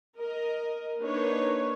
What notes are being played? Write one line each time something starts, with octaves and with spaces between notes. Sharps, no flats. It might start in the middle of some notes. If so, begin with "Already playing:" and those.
A#4 D#5
A#3 D4 D#4 B4 C#5